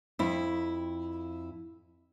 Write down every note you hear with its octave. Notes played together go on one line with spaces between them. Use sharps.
F2 E4